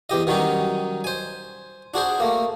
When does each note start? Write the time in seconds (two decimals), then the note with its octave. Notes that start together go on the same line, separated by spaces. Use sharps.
0.10 E2 G4 D#5
0.27 D#3 F#3 G3 C#4 D#4
1.04 C5 G#5
1.94 D4 F#4 G#4 C5
2.20 A3 A#3